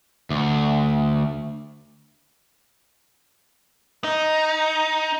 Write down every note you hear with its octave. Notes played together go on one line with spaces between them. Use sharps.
D2
D#4